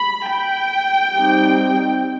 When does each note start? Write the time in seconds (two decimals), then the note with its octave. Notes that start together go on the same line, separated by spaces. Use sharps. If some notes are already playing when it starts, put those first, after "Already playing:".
Already playing: B5
0.30 G5
1.14 G3 C4 D#4